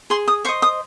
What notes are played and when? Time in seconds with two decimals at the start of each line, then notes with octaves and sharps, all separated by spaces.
0.10 G#4 C6
0.28 D#6
0.45 C5 D#5 C#6
0.62 D#6